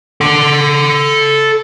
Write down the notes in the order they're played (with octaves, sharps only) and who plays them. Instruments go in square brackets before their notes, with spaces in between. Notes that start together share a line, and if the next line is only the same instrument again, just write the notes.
[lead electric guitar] A4 F#5